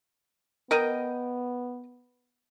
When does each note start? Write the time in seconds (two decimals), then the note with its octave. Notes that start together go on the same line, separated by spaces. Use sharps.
0.71 B3 A#4 D#5 G5